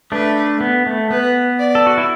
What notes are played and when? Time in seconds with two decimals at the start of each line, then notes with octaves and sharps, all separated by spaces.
0.12 A3 D4 B4
0.61 B3
0.87 A3
1.11 B3 B4
1.59 D5
1.75 A4
1.86 F#4
1.98 E4